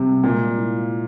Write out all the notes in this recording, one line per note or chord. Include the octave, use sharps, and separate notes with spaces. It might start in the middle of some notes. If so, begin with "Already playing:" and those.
Already playing: C3 G3
A#2 G#3
E4